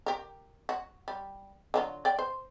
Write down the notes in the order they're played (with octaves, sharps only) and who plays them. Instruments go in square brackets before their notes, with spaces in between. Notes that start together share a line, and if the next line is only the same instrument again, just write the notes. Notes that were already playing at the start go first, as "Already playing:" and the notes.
[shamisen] G4 A#4
F#4
G3
D3 F#3 F4
D5 G5
C5